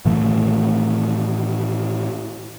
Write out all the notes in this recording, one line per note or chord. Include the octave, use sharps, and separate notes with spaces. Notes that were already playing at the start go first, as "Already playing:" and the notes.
A2 D#3 E3 A3